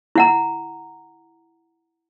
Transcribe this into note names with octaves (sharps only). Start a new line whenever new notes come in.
E4 F#5 A#5